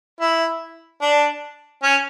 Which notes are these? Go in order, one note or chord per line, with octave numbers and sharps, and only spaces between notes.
E4
D4
C#4